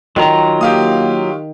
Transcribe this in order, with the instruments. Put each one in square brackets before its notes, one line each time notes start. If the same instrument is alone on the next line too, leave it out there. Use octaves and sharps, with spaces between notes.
[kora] D#3 [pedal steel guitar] F#3 F4 A#5
[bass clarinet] A#3 [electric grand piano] G4 F5 D#6